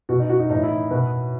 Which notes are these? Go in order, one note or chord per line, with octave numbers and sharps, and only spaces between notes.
B2 F#4
D#4
F#4
D#4
A2 E3 D#4
E4
B2 B4